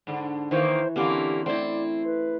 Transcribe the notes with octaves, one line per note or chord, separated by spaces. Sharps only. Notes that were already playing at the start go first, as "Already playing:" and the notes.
G#2 D3
D#3 E3 A#3 C5 C#5
D3 E3 A#3 C4 C#4 G4 D6
A3 C4 E4 D5
B4